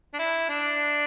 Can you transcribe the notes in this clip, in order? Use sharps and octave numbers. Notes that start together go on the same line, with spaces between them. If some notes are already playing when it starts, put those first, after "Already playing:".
D4
E4
D4